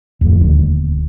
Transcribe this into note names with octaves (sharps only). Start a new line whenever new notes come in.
D1 F2
D#1 D2